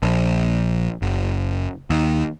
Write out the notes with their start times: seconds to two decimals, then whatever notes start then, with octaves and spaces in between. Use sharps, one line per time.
0.03 A#1
1.02 F#1
1.90 D#2